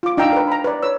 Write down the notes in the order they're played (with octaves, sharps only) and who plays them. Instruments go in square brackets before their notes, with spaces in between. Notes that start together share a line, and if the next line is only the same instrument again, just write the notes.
[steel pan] F4 D6
D4 D#4 F5 G5 A#5 E6
A#4 B4
A#5 B5
B4 D5
B4 C#5 E6